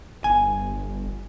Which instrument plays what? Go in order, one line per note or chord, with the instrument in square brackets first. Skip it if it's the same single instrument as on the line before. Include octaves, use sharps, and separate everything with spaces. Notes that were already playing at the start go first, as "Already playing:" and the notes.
[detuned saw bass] G1 [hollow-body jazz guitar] G#5